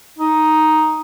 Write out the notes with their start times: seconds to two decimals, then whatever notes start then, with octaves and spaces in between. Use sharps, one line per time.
0.19 D#4